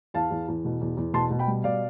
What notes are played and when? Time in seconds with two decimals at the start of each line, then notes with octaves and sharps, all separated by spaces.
0.14 E2 F5 A5
0.31 E2
0.48 E2
0.65 B2
0.81 E2
0.97 E2
1.14 B2 A5 C6
1.31 B2
1.39 G5 B5
1.47 G3
1.64 B2 D5 F5